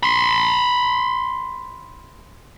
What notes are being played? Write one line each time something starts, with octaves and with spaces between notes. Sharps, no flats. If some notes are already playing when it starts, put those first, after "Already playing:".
B5 C6